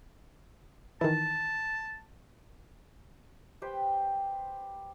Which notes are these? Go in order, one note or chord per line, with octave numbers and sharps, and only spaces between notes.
D#3 E3 A5
G4 B4 C5 G5